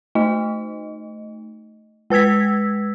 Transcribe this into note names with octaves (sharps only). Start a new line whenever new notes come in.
A3 D#4 D#5
G#3 B4 E6 G#6 B6